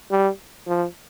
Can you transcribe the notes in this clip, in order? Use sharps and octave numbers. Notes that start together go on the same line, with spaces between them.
G3
F3